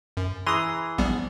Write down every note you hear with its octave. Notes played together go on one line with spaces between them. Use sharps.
F#2
E3 G#4 A#5 C6 D#6
A#1 G3 B3